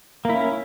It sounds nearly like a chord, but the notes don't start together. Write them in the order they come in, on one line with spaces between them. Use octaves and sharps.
A#3 E4 C#4